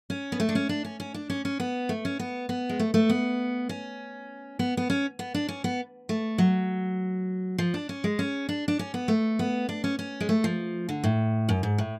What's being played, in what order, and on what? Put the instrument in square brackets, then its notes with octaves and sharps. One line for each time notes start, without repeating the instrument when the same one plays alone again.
[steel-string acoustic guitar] C#4
B3
A3
D4
C#4
D4
C#4
C#4
D4
C#4
C#4
B3
A3
C#4
B3
B3
G#3
A3
A3
B3
C#4
B3
B3
C#4
B3
D4
C#4
B3
A3
F#3
F3
D4
C#4
G#3
C#4
D4
D4
C#4
B3
A3
B3
D4
C#4
C#4
G#3
A3
F3
D3
A2
F#2
G#2
A2